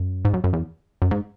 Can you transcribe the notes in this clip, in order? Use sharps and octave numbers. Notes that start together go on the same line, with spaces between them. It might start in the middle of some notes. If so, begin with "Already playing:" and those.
Already playing: F#2
G#2
F#2
F#2
E2
F#2
G#2